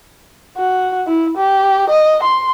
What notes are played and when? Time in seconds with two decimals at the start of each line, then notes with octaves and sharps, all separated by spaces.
0.57 F#4
1.07 E4
1.37 G4
1.90 D#5
2.23 C6